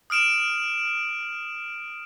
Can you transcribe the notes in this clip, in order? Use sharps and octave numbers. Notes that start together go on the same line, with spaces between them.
D#6 F6 D7 E7